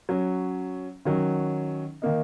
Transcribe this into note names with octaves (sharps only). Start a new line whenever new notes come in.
F#3 C#4
D#3 F#3 C#4
D#3 A#3 D#4